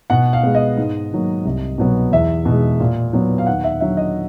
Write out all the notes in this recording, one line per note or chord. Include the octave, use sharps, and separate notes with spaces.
B2 F#5
F5
G#3 B3
D#5
G#2
D#3 F#3 A#3
C2
B2 F#3 B3
E2 E5
B2
G#3
A#2
F#3 B3
F5
D#2 F#5
E5
D3 F#3 E5
D#5